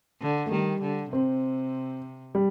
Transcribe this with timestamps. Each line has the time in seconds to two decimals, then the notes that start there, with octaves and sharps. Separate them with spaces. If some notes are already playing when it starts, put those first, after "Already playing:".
0.22 D3
0.46 A3
0.51 D#3 G3
0.82 D3
1.12 C3 C4
2.35 G3